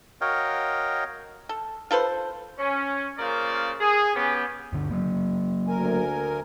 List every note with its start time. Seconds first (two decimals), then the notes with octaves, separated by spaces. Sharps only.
0.21 F#4 A#4 C#5 D#5 F5 G5
1.49 A4
1.91 F4 A4 B4 C5
2.59 C#4
3.19 C#3 A#3 F4 A#4 C5 D5
3.80 G#4
4.14 B3 C#4 G4
4.73 G1 D2 D3
4.91 F#3 A#3
5.68 D2 A#4 G#5